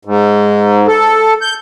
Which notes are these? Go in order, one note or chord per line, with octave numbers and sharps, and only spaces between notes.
G#2
A4
G6